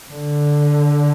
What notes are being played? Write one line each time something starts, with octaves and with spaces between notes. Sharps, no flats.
D3